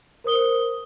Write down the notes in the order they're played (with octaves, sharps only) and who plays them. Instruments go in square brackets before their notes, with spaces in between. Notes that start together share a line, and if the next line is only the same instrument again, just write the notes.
[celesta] A#4 C5 D#6 G7